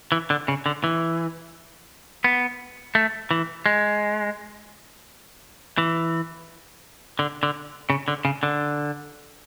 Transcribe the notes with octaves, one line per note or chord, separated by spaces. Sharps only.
E3
D3
C#3
D3
E3
B3
A3
E3
G#3
E3
D3
D3
C#3
D3
C#3
D3